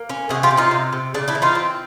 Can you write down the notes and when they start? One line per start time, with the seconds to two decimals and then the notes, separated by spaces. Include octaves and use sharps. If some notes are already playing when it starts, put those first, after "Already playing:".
Already playing: A#3
0.09 C#4
0.29 C3 F#4 G#4
0.43 F4 G4
0.51 C3
0.57 D#4 F4
0.71 C3
0.92 C3
1.14 C#3 D4
1.28 D4 E4
1.35 E3
1.42 D#4 F4
1.55 C4